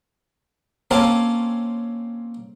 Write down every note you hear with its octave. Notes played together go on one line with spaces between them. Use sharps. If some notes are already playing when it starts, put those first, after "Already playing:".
A#3 C4 C#4 F4 A4 A#4